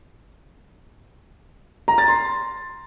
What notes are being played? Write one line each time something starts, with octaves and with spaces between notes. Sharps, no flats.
A#5
A6
C6